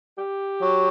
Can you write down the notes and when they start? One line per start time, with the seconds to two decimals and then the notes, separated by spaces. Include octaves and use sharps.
0.18 G4
0.61 F#3